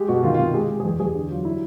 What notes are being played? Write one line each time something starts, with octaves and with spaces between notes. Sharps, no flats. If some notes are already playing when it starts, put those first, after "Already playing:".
Already playing: G#3 G4
B2 F#4
D#3 F4
C3 F4
G#3 G4
G#3
G#4
E2 G4
E2 G#4
D3 G4
F#3 F4
G3 E4